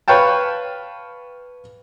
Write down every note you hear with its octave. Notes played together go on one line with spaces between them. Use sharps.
B4 C#5 F5 G5 A5